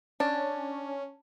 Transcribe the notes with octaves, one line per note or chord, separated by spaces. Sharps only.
C#4 D4